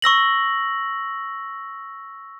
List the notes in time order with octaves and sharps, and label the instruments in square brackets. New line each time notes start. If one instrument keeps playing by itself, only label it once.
[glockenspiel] C#6 E6 A#6 F#7